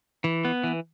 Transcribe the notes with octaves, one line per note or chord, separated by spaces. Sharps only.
E3
B3
E3